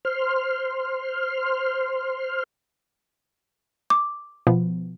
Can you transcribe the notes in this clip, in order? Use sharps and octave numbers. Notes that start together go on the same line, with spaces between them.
C5 C6 F6
D6
B2 F3 B3